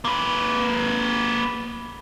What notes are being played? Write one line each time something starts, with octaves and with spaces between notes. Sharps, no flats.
A#3 B4